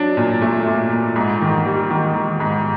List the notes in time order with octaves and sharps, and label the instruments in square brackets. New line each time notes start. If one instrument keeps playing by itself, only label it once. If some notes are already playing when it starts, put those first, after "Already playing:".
Already playing: [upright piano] F#3 D4
A#2
A3
A#2
A#2
G#2
D#3
G3
D#3
D#3
G#2